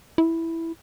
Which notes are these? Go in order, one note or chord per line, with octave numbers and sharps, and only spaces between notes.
E4